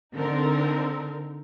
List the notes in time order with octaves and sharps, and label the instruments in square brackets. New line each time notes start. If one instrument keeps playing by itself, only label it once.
[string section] D3 C4 D#4 A#4